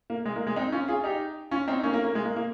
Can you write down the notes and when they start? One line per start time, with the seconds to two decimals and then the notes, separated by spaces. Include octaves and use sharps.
0.10 A#3
0.26 G#3
0.36 A#3
0.47 G#3
0.56 C4 D#4
0.72 C#4 F4
0.88 F4 G#4
1.04 D#4 G4
1.51 C#4 F4
1.68 C4 D#4
1.83 A#3 C#4
1.94 A#3
2.05 A#3
2.15 G#3
2.25 A#3
2.36 A#3